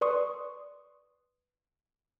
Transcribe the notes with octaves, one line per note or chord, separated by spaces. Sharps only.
B4 D5 C6 C#6 D#6